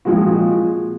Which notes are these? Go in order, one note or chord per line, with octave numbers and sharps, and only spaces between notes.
A#2 F3 G#3 C4 F#4